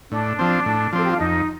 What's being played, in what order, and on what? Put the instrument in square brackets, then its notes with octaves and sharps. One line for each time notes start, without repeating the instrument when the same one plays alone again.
[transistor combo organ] A2 [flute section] D4
[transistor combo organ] F3 C4
A2
[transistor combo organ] F3 C4 [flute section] A4
[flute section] G4
F4
[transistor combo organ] F2 [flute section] D#4